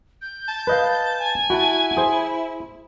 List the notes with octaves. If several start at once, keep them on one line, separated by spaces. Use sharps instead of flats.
G6
A5
B4 D#5 F5
G#5
E4 F#4 F#5 A5
G#4 C5